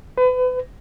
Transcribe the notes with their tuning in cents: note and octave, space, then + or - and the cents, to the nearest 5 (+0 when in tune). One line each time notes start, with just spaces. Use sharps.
B4 +35